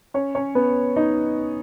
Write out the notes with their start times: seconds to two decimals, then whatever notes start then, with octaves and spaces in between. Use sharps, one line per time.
0.14 C#4 C#5
0.35 C#4 C#5
0.55 B3 B4
0.96 D#4 D#5